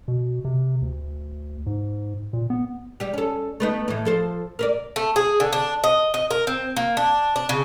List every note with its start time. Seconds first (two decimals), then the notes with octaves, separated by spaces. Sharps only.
0.08 B2
0.45 C3
0.82 D2
1.66 G#2
2.33 A#2
2.50 B3
3.00 G3 G4
3.14 C#4 A4
3.60 A3 B3 D#4
3.88 A2 E3
4.05 F3 A4 C5
4.59 A#4 B4 D5
4.96 A3
5.16 G#4
5.40 D3
5.53 D4
5.84 D#5
6.14 D#5
6.31 A#4
6.47 C4
6.77 A#3
6.97 D4
7.36 D4
7.49 C#3